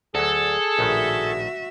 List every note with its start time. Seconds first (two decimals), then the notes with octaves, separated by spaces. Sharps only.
0.15 D2 F#3 G#4 A4
0.79 A#1 A2 D#3 F#4 E5